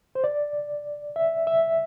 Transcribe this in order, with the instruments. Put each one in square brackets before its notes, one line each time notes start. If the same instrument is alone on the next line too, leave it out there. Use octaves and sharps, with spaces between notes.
[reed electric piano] C5
D5
E5
E5